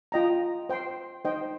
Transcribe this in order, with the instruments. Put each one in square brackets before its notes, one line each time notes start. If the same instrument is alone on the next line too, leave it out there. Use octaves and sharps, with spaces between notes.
[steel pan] F4 D#5 G5 A#5
C5 G5 C6
D#4 C5 D#5 G5